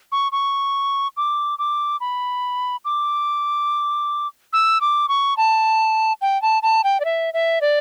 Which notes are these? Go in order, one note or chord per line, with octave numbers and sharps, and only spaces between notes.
C#6
C#6
D6
D6
B5
D6
E6
D6
C#6
A5
G5
A5
A5
G5
D5
E5
E5
D5